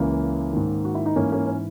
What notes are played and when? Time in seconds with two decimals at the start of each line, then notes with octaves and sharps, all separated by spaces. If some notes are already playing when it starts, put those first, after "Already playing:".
Already playing: C#2 C#3 E3 A#3 C#4
0.53 G#2 D#3
0.85 F#4
0.95 E4
1.06 D#4
1.16 G#2 E3 A#3 C#4
1.32 A#3 C#4
1.47 C#4